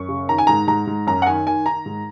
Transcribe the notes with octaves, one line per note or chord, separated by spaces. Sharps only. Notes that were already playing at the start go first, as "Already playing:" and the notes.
Already playing: F#2 C#6
C#3
D#3 A#5
G#5
G#2 A#5
G#2 A#5
G#2
F#2 A#5
F#5
D#3 G#5
D#3 G#5
D#3 A#5
G#2